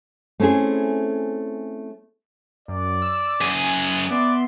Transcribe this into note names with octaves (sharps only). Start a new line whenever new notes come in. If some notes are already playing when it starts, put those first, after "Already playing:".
A3 C4 C#4 E4 G#4
F#2 D5
E6
F#2 G#4 G#5
B3 D5 E5 C6